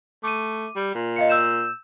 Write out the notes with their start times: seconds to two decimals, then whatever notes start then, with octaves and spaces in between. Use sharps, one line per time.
0.23 A3 D6 D#7
0.76 G3
0.94 A#2
1.16 D#5 F5 C#7
1.29 E6 G6 E7